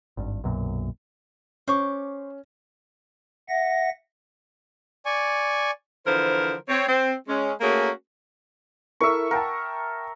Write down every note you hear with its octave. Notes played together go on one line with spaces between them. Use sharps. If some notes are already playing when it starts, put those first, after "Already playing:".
G#1 G2
B1 F#2 A#2
C#4 C5 C#6 D6
E5 F#5 A#6
D5 G#5 C#6
D3 E3 F3 A#4 C5
C4 C#5
C4
G#3 C#4
A3 A#3 C#4 F#4 G#4 A#4
E4 A4 A#4 E5 C#6
A#4 F#5 G5 A5